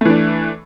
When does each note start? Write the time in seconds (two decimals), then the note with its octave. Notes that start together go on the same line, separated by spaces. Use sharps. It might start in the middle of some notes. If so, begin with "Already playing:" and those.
0.01 A3
0.05 E3
0.10 D4